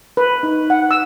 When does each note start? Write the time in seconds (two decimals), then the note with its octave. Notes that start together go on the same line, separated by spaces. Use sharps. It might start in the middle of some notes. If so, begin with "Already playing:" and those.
0.17 B4
0.43 D#4
0.70 F#5
0.91 E6